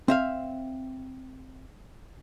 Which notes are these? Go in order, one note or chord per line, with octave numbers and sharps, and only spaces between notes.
C4 E5 F5